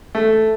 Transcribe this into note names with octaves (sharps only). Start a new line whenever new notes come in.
A3